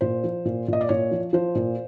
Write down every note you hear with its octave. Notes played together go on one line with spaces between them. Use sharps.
A#2 C5
F3
A#2
A#2 D#5
D5
A#2 C#5
F3
F3 C5
A#2